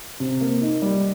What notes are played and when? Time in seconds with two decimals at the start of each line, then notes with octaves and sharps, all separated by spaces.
0.20 C3
0.41 A#3
0.61 D#4
0.82 G3